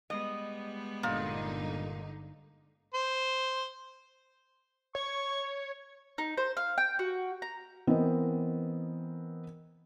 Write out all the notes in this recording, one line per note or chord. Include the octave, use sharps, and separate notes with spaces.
G3 G#3 B3 D#5
G1 A#2 D3 D#4
C5
C#5 C#6
D#4
C5
F5
G5
F#4
A#5
E3 B3 C4 A#4 D#5